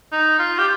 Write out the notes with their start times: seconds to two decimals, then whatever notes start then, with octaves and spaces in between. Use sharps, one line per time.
0.12 D#4
0.39 F4
0.59 G4